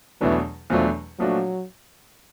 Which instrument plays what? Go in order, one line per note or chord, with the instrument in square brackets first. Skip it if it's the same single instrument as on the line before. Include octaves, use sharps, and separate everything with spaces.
[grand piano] E2 B2 F#3 A3 D4 [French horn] E3
[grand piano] E2 B2 F#3 A3 D4 [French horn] F3
[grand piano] A#2 F3 A3 D4 F#4 [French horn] F#3